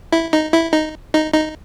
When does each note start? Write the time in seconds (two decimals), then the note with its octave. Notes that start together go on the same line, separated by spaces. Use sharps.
0.12 E4
0.33 D#4
0.53 E4
0.73 D#4
1.14 D#4
1.33 D#4